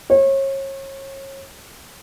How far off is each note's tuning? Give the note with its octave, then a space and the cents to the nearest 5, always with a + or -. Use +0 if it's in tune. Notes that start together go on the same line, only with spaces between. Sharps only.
C#5 -35